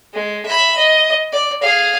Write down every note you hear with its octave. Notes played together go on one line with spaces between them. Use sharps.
G#3
E5 B5
D#5
D5
G#4 F5